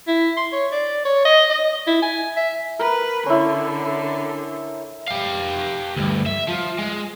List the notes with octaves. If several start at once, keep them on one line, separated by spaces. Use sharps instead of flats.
E4
C6
C#5
D5
C#5
D#5
D#5
E4
G#5
E5
A#4 B4
D3 C#4 E4
G4 F5
D2 G2
E5
F3
G#3